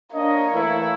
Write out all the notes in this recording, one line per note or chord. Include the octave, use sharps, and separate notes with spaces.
A#3 D4 C#5 D#5
E3 A3 E4